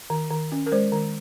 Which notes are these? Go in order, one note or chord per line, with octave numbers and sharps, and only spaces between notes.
D#3
D#3
C#4
A#4
G#3 C5
D#3